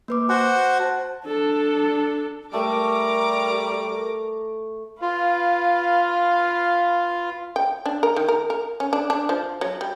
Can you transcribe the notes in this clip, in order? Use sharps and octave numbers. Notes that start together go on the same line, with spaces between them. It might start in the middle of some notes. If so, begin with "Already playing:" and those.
A#3 B4 D6
F#4 C5 F#5 G#5
C5 A5
D4 A4
G3 A3 A#4 A#5 D6
F4 B4 F5
G5
D4
A#4
D#3
A#4
A#4
C#4
D4
D4
F3
F#3
G3